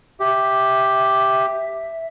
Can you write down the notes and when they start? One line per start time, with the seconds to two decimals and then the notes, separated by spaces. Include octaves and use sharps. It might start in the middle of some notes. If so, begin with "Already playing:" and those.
0.20 G4 E5